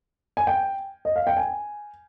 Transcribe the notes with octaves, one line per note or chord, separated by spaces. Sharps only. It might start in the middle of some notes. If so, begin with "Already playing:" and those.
G#5
G5
D#5
F5
G5
G#5